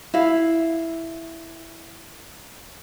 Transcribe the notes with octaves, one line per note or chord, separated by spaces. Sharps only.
E4 F5